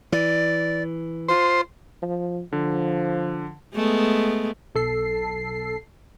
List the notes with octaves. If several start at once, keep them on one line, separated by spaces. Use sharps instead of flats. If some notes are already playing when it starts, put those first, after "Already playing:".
E3 D5
F4 C5
F3
D3 F3
G#3 A3 B3
B1 A4 C7